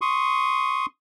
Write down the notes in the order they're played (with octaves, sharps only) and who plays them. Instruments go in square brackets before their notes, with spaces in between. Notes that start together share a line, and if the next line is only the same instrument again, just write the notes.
[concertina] C6 C#6 D#6